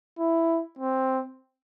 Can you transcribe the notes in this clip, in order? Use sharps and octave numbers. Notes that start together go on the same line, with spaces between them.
E4
C4